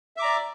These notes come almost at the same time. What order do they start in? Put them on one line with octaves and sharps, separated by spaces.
E5 D6 A#5 D5